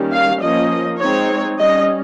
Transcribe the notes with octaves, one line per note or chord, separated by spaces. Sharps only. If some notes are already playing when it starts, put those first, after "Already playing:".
Already playing: D#3 G3 A#3 C#4
F5
F3 A#3 C#4 D#5
G#3 C4 D#4 C#5
G3 C#4 D#5